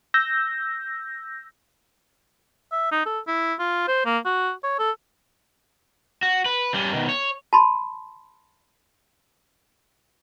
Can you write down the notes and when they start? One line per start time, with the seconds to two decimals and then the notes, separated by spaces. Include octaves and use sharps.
0.14 E6 G6 A#6
2.72 E5
2.92 D#4
3.06 A4
3.28 E4
3.59 F4
3.88 C5
4.06 A#3
4.25 F#4
4.64 C#5
4.79 A4
6.23 F#4
6.46 B4
6.74 G3 C#4
6.93 B2 D#3
7.09 C#5
7.53 A5 B5 C6